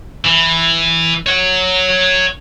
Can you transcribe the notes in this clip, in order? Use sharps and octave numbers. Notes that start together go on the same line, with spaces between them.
E3
C#5 F#5